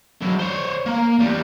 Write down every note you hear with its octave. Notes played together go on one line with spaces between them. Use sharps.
F#3 E4
C5 C#5
A#3 A#5
E2 G3